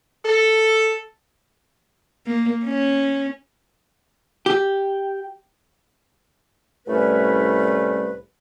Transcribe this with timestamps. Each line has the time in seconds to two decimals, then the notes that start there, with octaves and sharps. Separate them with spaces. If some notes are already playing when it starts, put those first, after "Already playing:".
0.25 A4
2.27 A#3
2.65 C#4
4.46 G4
6.87 C2 A2 G3 A3 C#4 B4